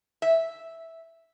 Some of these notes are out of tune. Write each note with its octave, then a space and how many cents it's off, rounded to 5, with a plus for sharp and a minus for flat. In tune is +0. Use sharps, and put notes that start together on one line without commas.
E5 -5